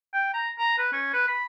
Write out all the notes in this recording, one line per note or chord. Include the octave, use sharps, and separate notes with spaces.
G5
A#5
A#5
B4
C#4
B4
B5